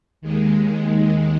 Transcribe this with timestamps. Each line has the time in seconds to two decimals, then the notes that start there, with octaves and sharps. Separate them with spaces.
0.21 D#2 D#3 G#3